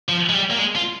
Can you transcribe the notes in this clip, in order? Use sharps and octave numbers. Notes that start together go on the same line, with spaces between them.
F3
G#3
G3
A#3
G#3
F4